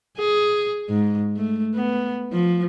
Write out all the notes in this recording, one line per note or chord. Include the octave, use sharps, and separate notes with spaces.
G#4
G#2
A3
B3
F3